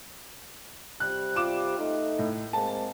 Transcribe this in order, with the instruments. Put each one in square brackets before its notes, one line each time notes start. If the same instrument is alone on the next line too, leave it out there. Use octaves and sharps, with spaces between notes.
[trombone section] C3 G3 [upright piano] F#6
[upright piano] F4 D6 E7
[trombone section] A3 D#4
[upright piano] A2
[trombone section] G#3 A#3 C4 [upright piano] A5